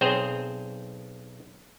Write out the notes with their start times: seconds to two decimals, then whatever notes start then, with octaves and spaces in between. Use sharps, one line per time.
0.01 B1 C4 G#4 C5 A#5